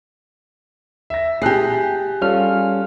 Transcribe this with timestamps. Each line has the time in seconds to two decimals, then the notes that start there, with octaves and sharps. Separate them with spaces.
1.10 E5 A#6
1.42 G4 G#4 A5 F#6 C7
2.22 G3 C#4 F4 A4 F6